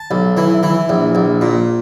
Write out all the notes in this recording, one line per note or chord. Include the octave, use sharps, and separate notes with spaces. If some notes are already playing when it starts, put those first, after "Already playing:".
Already playing: A5
B1
E3
E3
A#1
A#1
A#2